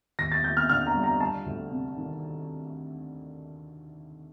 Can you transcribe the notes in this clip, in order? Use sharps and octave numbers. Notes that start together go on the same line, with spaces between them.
D#2 A#6
A6
D#2 G6
F6
D3 F6
A#5
G3
A#5
G3 A5
D2
C3
D#3